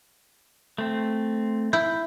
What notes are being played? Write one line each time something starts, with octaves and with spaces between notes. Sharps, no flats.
A3 C4
E4 G6